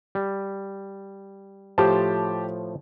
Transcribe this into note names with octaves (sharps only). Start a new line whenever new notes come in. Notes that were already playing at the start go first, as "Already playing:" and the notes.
G3
A2 F3 G4 C5 A5